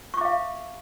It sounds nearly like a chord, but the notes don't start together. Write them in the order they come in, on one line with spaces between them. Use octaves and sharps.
C#6 D6 E5 F5